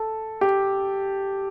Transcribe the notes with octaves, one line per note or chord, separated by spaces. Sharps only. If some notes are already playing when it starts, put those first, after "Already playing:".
Already playing: A4
G4